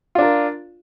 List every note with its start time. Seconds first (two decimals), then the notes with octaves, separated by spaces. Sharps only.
0.15 F4
0.18 D4
0.22 A#4